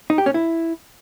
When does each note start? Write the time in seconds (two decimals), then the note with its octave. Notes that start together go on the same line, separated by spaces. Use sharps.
0.10 D#4
0.18 G4
0.26 C#4
0.34 E4